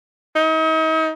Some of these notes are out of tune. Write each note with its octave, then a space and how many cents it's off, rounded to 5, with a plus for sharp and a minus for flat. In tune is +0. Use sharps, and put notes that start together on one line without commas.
D#4 +40